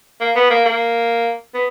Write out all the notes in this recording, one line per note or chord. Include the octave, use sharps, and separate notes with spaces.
A#3
B3
A#3
A#3
B3